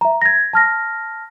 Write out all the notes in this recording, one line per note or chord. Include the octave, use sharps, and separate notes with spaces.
E5 A#5
G#6 A#6
A5 F6 A#6